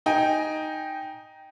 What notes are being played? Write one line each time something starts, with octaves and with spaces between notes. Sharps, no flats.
D#4 G5 G#5